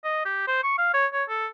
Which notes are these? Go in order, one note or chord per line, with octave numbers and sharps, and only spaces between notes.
D#5
G4
C5
C#6
F5
C#5
C#5
A4